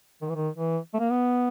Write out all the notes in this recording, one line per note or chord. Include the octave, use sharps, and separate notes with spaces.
D#3
E3
D#3
E3
A3
A#3
B3